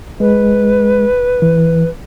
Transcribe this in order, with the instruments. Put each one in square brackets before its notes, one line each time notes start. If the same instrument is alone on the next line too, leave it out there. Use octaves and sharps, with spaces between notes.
[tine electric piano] G#3 [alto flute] B4
[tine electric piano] E3